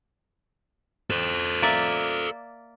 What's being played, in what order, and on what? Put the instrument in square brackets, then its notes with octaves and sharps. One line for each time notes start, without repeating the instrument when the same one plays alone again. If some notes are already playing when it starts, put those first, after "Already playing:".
[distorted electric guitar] A4 C5
[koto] A#3 D5 E5